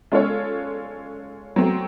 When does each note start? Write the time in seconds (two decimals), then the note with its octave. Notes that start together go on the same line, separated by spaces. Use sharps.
0.12 G#3 C#4 F4 A4 C#5
1.56 F#3 A3 C4